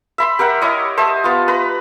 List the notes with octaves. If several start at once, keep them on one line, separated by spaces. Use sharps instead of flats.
E5 B5 C6
G4 A#4 E5 F#5
E4 C#5 D#5
C5 D#5 E5 A5
B3 F4
B4 A#5